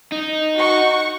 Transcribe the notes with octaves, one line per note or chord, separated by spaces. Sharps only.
D#4
F#4 F#5 C#6